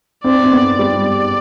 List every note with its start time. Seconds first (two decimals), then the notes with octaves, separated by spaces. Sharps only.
0.24 C4 D5
0.44 C4
0.52 B3
0.79 G3 D5